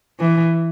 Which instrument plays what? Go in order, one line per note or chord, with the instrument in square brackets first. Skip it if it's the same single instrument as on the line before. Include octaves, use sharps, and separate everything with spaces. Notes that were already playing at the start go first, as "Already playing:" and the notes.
[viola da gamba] E3